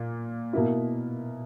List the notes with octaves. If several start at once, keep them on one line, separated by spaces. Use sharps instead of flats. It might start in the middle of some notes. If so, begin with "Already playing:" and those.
Already playing: A#2
B2 A#3 E4